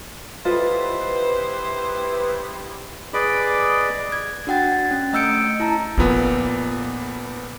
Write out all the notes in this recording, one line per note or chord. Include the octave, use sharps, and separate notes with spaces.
G3 B3 E4 F4 A4 B4 C5 D#5
G#4 B4 D5 D#5 B5 D6
G#6
D4 F#4 F#5 G5 A6
C#4
A3 D#5 E6 G6 C#7 D7
E4 A5 A#5
F2 A#2 B3 D#4 F4